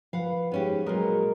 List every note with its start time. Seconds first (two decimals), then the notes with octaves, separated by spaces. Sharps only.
0.13 F3 B4 F5 F#5
0.52 G#2 B3 C#4 G4
0.86 A#2 F#3 G#3 A#4 D#5